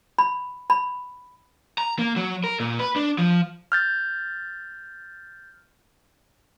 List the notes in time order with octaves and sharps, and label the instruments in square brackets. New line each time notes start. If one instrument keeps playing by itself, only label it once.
[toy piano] B5
B5
[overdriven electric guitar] A#5
A#3
F#3
A#4
A#2
B4
D4
F3
[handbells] F6 G6 A6